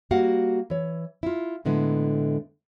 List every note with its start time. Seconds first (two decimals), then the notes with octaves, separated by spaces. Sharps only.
0.11 G3 A#3 F#4 F5 F#5
0.70 E3 C#5
1.23 E4 F4
1.65 A2 D3 G#3 B3 E4